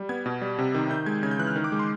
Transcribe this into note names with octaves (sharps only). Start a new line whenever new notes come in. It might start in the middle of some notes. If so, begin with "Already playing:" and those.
Already playing: G3
B3 G#6
B2
G3
C3
D#3
D#3 G6
G#3 G#6
C#3 G#6
G6
E3 F#6
F6
D#3
D6
G#3
C6